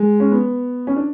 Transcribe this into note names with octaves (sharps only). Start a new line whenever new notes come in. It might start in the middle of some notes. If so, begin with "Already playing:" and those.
Already playing: G#3
C#4
B3
C#4
D4